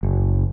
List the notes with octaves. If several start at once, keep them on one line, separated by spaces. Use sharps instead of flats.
F#1